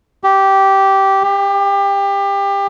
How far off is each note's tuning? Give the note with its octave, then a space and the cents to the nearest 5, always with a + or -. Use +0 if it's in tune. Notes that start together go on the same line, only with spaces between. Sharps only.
G4 -10
G4 +25